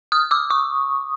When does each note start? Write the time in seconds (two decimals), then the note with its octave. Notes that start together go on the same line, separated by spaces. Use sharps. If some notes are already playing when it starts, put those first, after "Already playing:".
0.12 D#6 F6
0.31 D6 E6
0.50 C#6 D#6